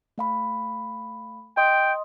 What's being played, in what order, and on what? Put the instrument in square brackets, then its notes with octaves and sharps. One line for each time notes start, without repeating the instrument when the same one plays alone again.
[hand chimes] A3 F5 B5
[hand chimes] D#5 C6 D#6 [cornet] G5